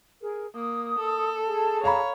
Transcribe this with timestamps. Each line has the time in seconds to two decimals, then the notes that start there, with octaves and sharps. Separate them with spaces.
0.21 G#4 A#4
0.55 A#3 D#6
0.99 A4
1.46 G#4 A5
1.84 C#5 F5 A#5 B5